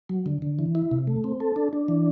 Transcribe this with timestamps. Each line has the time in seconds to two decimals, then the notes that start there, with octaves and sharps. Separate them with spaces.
0.09 F#3
0.26 D3
0.42 D3
0.59 E3
0.75 E4
0.91 C3
1.07 A3
1.24 C4
1.40 A4
1.56 D4
1.73 D4
1.88 E3